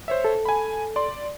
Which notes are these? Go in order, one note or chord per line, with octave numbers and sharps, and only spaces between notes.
C5 C#5 E5
A4
G#5 B5
D5 C6